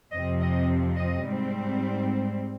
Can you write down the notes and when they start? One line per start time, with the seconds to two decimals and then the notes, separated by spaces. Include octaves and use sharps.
0.12 F2 C3 F3 C4 D#5
0.40 D#5
0.96 D#5
1.24 G#2 G3 C4